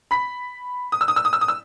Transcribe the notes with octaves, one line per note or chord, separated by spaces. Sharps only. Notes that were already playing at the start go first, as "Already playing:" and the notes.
B5 B6
D#6
E6
D#6
E6
D#6
E6
D#6
E6